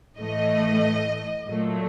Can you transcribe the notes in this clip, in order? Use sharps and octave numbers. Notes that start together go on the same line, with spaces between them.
A2 E3 A3 D#5
A#2 F#3 A3